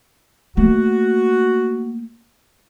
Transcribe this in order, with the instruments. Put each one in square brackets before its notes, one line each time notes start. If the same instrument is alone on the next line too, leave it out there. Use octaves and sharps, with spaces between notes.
[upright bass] A3 A#3 [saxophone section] F#4